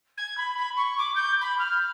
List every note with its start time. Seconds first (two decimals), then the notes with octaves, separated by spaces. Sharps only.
0.17 G#6
0.37 B5
0.58 B5
0.77 C#6
0.98 D6
1.15 G6
1.41 B5
1.59 F6